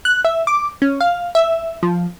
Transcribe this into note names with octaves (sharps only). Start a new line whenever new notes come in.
F#6
E5
D6
C#4
F5
E5
F3